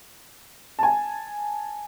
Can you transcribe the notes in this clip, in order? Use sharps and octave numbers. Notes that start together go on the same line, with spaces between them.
G#5 A5